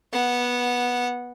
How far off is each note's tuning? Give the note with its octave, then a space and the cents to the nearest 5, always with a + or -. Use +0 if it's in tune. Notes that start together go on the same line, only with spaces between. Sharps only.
B3 -15 F#5 -10